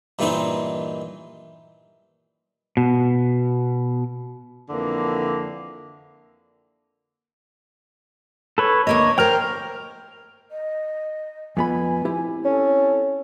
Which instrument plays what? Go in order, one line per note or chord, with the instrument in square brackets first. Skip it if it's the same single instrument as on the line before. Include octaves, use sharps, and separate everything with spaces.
[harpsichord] G2 A#2 D#3 E3 C4 D#4
[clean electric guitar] B2
[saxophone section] F2 D3 E3 A#3
[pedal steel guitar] A4 B4 C#5
[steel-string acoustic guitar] D2 A#3 D#5 [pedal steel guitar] C#5
[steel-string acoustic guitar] A#4 C5 [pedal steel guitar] G5 F6
[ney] D#5
[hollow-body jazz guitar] F2 B3 B5 [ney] G#5
[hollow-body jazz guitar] C4 E4 G4
[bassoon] C#4 [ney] A4